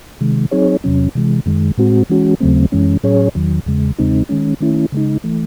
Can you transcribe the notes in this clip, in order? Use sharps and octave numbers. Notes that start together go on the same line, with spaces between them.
C3 D#3 G#3
F#3 C4 D#4 G#4 C#5
E2 C3 F#3 C#4
C3 E3 G#3
F#2 D#3 G#3
A2 G#3 C4 F#4
E3 G#3 C#4 F#4
D#2 C#3 F#3 A3 C4
F#2 E3 G#3 C#4
A2 F#3 C#4 G#4 C#5
E2 D#3 F#3
E2 C#3 G#3
E2 C#3 G#3 C4 D#4
D#3 G#3 C#4
D#3 A3 C#4 E4
C#3 G#3 D#4
E3 A3